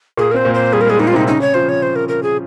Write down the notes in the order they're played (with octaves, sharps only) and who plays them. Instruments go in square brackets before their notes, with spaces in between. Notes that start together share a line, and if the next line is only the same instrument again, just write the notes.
[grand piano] A#2 A#3 [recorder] G#4
[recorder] A#4
[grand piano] C4 [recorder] C5
[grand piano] A#2 A#3
[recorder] C5
[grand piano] G3 [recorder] G#4
[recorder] A#4
[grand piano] G#3
[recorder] G#4
[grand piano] A#2 A#3 [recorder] D#4
[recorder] F4
[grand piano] C3 C4 [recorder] D#4
[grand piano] C#3 C#4 [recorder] D#4
[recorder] C#5
[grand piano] F3 F4 [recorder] C5
[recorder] C#5
C5
A#4
A#4
G#4